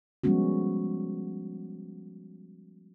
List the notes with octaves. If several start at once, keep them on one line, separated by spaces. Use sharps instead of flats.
F3 G3 G#3 B3 C#4 F#4